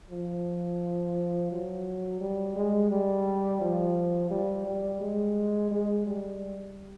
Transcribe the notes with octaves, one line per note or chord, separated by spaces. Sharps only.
F3
F#3
G3
G#3
G3
F3
G3
G3
G#3
G#3
G3